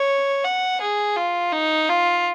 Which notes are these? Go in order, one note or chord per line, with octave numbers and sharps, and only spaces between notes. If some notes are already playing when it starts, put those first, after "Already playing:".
Already playing: C#5
F#5
G#4
F4
D#4
F4